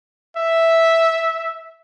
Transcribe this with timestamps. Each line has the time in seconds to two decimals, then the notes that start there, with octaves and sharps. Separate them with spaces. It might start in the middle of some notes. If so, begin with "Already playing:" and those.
0.37 E5